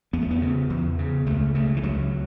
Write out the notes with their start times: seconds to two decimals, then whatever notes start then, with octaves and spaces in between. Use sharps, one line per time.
0.13 E2 B3
0.22 A3
0.31 B3
0.42 C#3
0.70 E2
0.99 C#3
1.26 C#2 A3
1.55 C#3 A3
1.76 E3
1.83 C#2 F#3